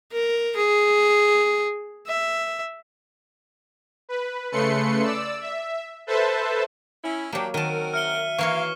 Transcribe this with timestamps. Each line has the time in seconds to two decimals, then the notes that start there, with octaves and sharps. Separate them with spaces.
0.12 A#4
0.56 G#4
2.07 E5
4.09 B4
4.52 C#3 A3 B4 C6 C#7
5.03 D5 E6
5.41 E5
6.07 A4 B4 C5 E5 A5
7.04 C#4 E4
7.32 F#3 A#3 D4 G4
7.54 D#3 C4 F#4 A#4 A5 D#7
7.94 E5 F6 C#7 G7
8.38 E3 A#3 F#4 C#5 F5 C#6